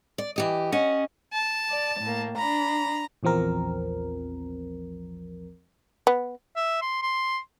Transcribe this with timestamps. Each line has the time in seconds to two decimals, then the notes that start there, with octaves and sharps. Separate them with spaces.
0.18 D5
0.36 E3 G4 D#5
0.72 C#4 D#5 F#5
1.33 A5
1.70 D5
2.01 A2 A#3
2.37 D4 A#5 B5
3.23 A#1 E2 F3 C4 A#4
6.07 B3
6.56 E5
6.82 C6
7.02 C6